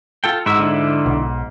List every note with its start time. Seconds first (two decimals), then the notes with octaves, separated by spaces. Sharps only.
0.24 F4 A4 G5
0.46 G#2 E4 F#4 E5
0.59 D3 D4 E4
1.06 B1